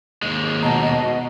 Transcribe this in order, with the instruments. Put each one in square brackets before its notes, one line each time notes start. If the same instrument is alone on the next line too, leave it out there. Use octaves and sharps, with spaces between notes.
[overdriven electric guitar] D#2 G#3
[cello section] B2 [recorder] D#5 [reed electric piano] A5 A#5